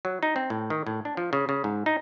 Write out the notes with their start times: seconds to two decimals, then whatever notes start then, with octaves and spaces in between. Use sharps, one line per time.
0.05 F#3
0.23 D#4
0.36 C4
0.50 A2
0.70 D#3
0.87 A2
1.05 D4
1.17 F3
1.33 C#3
1.49 C#3
1.64 G#2
1.86 D#4